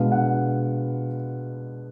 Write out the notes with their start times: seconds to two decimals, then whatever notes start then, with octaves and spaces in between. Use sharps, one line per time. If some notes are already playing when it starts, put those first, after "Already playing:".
Already playing: B2 G#3 B3 D4 F5
0.12 F#5